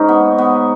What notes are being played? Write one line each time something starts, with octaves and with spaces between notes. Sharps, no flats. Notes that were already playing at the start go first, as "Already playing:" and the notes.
Already playing: G#2 C#4 D#4
B3
B3